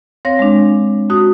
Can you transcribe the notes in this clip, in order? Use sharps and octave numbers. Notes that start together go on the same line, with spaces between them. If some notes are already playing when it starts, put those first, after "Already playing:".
C4 C#5 F5 A#6
G#3 D4
F2 F#4 D#6